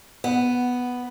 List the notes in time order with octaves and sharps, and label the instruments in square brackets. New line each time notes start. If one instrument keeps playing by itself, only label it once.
[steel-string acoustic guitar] B3